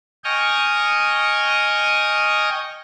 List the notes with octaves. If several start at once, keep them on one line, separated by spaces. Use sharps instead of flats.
D#5 G5 G#5 C#6 D#6 F6